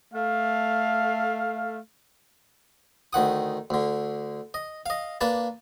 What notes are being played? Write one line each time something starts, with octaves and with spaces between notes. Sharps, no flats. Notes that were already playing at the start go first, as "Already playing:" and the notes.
A3 F5
D2 D#3 F#5 D#6
D2 D3
D#5
D#5 F5
A#3 D4 B4 A5